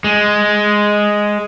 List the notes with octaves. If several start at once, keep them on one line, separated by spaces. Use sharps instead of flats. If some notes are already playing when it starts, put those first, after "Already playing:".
G#3